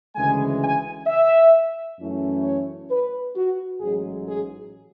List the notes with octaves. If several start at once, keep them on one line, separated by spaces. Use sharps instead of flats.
D2 C#3 E3 G#3 G#5
G#5
E5
F#2 E3 A3 C#4 E4
C#5
B4
F#4
A1 G#2 F#3 G#4
G#4